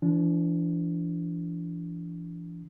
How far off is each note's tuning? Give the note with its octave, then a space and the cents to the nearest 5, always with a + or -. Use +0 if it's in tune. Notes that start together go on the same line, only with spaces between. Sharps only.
E3 +40 D4 -20